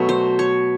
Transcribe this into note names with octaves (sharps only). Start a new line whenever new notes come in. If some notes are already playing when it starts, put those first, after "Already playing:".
Already playing: B2 F#3 A3
C5
C#5